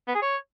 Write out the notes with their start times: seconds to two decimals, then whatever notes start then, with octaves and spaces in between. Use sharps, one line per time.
0.08 B3
0.15 G#4
0.22 C#5